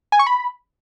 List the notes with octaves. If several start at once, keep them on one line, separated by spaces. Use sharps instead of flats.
G#5
C#6
B5